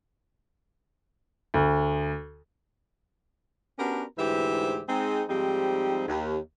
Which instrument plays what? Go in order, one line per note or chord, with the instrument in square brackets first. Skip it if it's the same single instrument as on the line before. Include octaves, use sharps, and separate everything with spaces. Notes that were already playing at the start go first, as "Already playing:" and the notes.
[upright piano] D2
[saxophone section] B3 C#4 D4 F#4 G4 A#4
D2 G#2 E3 G4 C5 E5
G#3 C4 D#4
G#2 F3 G3 C4 D#4 G4
D#2